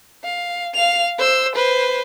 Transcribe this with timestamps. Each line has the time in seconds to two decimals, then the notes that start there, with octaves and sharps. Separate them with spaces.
0.24 F5
0.75 F5 F7
1.19 C5 E6
1.56 B4 C5